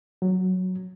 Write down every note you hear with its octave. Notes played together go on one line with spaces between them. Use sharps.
F#3